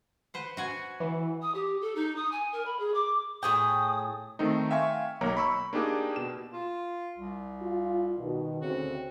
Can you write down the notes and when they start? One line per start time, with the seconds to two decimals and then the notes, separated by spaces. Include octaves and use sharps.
0.34 B4 C5 F#5
0.57 F#4 F#5 G#5
1.00 E3
1.42 D#6
1.54 G4
1.81 A4
1.95 D#4
2.16 D#6
2.31 G#5
2.52 A#4
2.65 B5
2.79 G#4
2.94 D6
3.43 A2 G#4 G5 D#6
4.39 D#3 A3 C4 D#4
4.71 E5 F5 G5 G#5 C6 C#6
5.21 B1 A#3 C#5 A#5
5.37 B5 C#6 E6
5.73 A#3 D4 D#4 G4 G#4
6.16 B2 E7
6.53 F4
7.18 C2
7.61 F4
8.18 B2 D#3
8.61 D2 C#3 C4 F#4